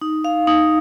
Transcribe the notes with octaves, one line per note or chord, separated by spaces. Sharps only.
D#4
F5
D#4